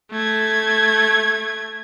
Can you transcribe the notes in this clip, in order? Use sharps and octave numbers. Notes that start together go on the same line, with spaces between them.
A3 G#6